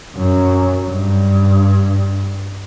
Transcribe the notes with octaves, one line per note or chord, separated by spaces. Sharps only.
F#2
G2